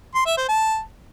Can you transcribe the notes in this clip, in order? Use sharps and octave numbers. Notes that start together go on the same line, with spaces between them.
C6
E5
C5
A5